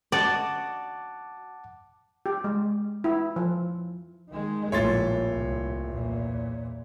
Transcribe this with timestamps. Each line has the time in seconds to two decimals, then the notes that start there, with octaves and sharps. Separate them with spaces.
0.12 F#4 D5 D#5 F#5 A5 D6
2.26 G4
2.44 G#3
3.04 E4
3.36 F3
4.30 D#3 G#3
4.72 D#1 A#1 A2 A3 C#5 C6 A6
5.32 C2
5.88 E2 A#2